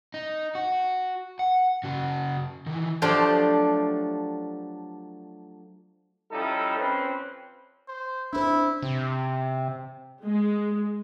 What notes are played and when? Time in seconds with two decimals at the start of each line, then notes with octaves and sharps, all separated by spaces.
0.14 D#4
0.55 F#4
1.39 F#5
1.84 C#3 F#4
2.66 D#3 E3
3.02 F3 F#3 A3 D4 G4 C6
6.32 F3 G3 C#4 D#4 E4 A4
6.78 F2 C4 C#4 B4
7.88 C5
8.33 D4 E4 C5
8.82 C3
10.24 G#3